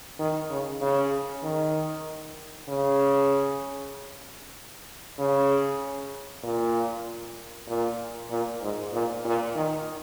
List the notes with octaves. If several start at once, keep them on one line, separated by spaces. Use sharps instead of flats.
D#3
C#3
C#3
D#3
C#3
C#3
A#2
A#2
A#2
G#2
A#2
A#2
D#3